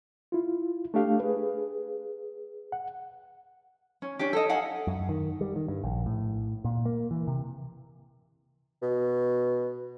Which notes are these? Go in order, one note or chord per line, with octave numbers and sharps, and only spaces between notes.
E4 F4
A3 D4 G4 F5
G#4 B4
F#5
C#4
C#4 D4 G4
A4 D#5
D#5 F5 F#5 G#5
F#2
D#3
G3
D#3
G2
A#1
A2
A#2
A#3
E3
C3
B2